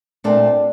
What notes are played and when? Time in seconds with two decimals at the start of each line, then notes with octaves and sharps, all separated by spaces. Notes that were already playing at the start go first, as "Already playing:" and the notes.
0.24 A#2 A3 C4 D4